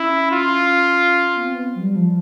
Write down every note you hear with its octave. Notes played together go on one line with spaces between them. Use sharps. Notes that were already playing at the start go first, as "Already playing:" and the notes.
Already playing: C#4 E4
F4
B3
C4
B3
F#3
G3
F3